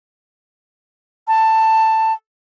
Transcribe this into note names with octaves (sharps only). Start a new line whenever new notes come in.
A5